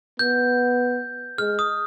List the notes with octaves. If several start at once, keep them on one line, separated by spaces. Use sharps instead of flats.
B3 G6
G#3 F6
D#6